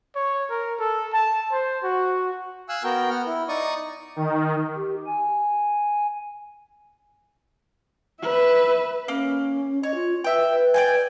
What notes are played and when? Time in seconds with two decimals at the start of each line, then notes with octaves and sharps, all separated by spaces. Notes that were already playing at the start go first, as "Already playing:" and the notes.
0.16 C#5
0.50 A#4
0.79 A4
1.13 A5
1.52 C5
1.83 F#4
2.69 F5 G#5 E6 F#6
2.84 B3 F#4 A#4 G5
3.10 B3 F#5 F6
3.26 E4
3.49 D#4 D5 C#6 D#6
4.16 D#3
4.76 G4
5.06 G#5
8.22 B4 E5
9.08 A#3 C#4
9.83 C#5 D#5
9.95 F4
10.24 B4 E5 G5
10.49 B4
10.74 D5 G5 G#5